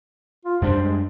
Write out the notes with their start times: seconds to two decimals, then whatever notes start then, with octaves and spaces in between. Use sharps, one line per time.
0.45 F4
0.62 F#2 G3 D4 C5
0.82 G#3